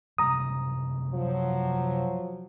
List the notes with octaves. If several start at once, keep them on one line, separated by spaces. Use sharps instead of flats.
F#1 C3 G3 A#5 D#6
F3 F#3